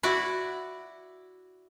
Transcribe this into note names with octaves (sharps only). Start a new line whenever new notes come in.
E4 F#4 D5